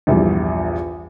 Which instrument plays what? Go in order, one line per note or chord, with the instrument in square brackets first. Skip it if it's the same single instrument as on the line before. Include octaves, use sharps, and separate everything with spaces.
[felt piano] A#1 E2 G2